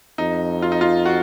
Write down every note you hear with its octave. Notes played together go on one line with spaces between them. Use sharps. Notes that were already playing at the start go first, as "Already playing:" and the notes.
F2 D#4
F4
D#4
F4
F#4